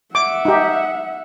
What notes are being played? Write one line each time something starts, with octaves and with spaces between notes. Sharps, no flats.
E5 F#5 D6
D#4 G4